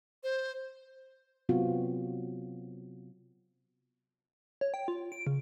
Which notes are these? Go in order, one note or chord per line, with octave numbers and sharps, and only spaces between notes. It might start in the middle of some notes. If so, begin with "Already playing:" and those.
C5
C3 F#3 B3 C4 F4 F#4
C#5
G5
F4
D7
C#3